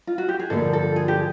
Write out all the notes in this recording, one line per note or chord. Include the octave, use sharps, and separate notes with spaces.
F4
F#4
G4
G#4
G2 D3 F3 A#3 A4
A4
G#4
G4